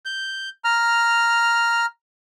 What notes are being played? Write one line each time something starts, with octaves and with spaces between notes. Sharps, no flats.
G6
A#5 F6